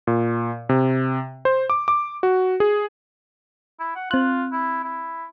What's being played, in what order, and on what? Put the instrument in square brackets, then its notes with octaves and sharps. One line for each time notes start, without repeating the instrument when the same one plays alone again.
[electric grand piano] A#2
C3
C5
D6
D6
F#4
G#4
[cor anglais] E4
F#5
[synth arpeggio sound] C4 F#6 [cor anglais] F4
[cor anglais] E4
E4